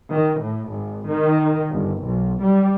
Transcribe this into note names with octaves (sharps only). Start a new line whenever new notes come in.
D#3
A2
G#1
D#3
G1
B1
G3